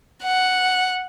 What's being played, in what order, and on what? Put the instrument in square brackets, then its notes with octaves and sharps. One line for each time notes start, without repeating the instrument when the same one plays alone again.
[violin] F#5